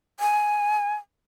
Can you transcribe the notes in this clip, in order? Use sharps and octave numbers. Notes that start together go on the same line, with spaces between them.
G#5